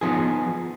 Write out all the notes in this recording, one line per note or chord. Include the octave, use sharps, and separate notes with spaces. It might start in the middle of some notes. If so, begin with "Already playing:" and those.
F3 B3 D#4 G#4